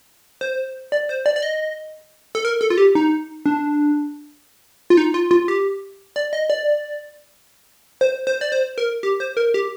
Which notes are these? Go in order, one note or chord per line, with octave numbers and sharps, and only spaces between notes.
C5
D5
C5
D5
D5
D#5
A4
A#4
A4
F4
G4
D#4
D4
F4
D#4
F4
F4
G4
D5
D#5
D5
C5
C5
D5
C5
A#4
G4
C5
A#4
G4